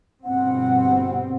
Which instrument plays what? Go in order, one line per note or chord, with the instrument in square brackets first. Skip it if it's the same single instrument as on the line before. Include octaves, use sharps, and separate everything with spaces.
[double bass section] G1 B2 C4 [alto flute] F#5